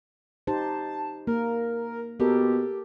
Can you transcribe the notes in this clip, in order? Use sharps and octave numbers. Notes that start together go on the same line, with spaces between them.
D#4 G4 C5 A5
A#3 A#4
B2 G4 A4 A#4